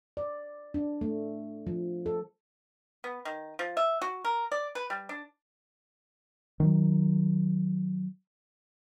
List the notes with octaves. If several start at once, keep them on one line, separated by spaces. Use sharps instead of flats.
D5
D4
A3
F3
A4
B3
D#3
F3
E5
F#4
A#4
D5
B4
G3
D4
D#3 F#3